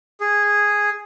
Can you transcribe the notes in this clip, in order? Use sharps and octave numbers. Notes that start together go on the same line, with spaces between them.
G#4